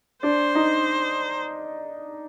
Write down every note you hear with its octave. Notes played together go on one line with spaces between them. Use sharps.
D4 C5
D#4